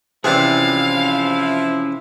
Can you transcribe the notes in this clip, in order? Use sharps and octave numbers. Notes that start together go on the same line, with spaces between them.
C3 E3 F3 C#4 D4 E4 G#4 F5